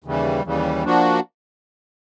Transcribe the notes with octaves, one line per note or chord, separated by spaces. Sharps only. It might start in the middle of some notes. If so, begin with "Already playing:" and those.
D#2 C#3 E3 G3
D#2 C#3 E3 G3
F3 A#3 D4 F#4